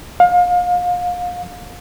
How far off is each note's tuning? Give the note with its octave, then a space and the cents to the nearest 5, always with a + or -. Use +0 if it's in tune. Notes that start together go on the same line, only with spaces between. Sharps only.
F5 +30